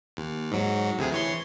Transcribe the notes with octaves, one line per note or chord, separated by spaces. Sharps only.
D#2
G#2 F#3
D2 C3 G#4
E3 C#5 C6